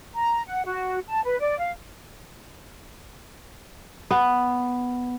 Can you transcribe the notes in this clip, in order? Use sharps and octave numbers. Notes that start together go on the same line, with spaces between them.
A#5
F#5
F#4
A5
B4
D5
F5
B3